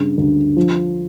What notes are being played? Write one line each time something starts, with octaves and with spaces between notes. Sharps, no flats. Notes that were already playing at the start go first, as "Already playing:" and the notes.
Already playing: G2 C#3
D2
F3